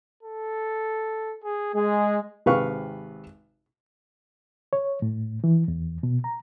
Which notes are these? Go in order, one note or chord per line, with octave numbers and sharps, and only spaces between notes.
A4
G#4
G#3 G#4
G#1 C3 B4 F5 C#6
C#5
A2
E3
E2
B2
A#5